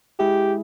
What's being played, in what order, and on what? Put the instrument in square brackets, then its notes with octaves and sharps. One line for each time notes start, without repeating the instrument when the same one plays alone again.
[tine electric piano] G#3 E4 G#4 E5 [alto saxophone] G4